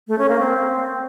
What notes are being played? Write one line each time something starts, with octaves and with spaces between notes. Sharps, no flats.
A3
C#4
A#3
C4